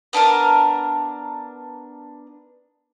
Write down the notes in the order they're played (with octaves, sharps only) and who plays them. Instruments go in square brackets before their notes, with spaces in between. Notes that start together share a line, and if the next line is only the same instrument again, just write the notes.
[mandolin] B3 D4 A4 A#4